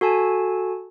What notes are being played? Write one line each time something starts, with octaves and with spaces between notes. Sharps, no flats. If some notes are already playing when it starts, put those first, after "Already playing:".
F#4 A4 G#5 A5